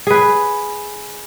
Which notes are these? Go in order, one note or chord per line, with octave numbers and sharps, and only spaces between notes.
G#4 B4